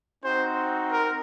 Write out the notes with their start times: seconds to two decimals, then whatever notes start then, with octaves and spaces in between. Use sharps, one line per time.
0.24 C4 D#4 F#4 C5
0.92 A#4